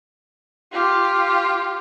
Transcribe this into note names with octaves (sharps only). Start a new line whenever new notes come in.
F4 G4